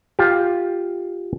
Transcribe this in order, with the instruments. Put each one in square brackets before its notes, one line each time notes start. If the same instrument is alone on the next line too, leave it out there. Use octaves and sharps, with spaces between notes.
[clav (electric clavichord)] F4 G4